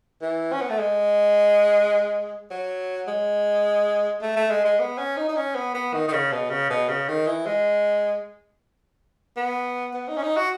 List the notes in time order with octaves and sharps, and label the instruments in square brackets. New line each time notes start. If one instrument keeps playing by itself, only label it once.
[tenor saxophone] E3
C#4
B3
A3
G#3
F#3
G#3
A3
A3
G#3
G#3
B3
C#4
D#4
D#4
C#4
B3
B3
D#3
D#3
C#3
B2
C#3
B2
C#3
D#3
E3
G#3
B3
B3
D#4
C#4
D#4
F#4